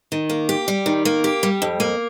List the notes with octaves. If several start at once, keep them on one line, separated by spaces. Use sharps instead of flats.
D#3
A#3
G4
G3
D#3
A#3
G4
G3
F2
A#3